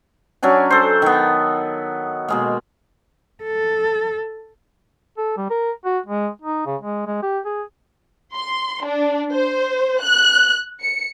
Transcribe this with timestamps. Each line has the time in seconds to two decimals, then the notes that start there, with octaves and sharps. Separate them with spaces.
0.43 F#3 C#4 D4 G#5
0.70 A4 C5
1.02 D#3 B3
2.28 B2 G#3 A#3
3.44 A4
5.18 A4
5.37 G3
5.50 A#4
5.85 F#4
6.06 G#3
6.42 D#4
6.66 C#3
6.81 G#3
7.07 G#3
7.23 G4
7.45 G#4
8.35 C6
8.84 D4
9.32 C5
10.02 F#6
10.80 C#7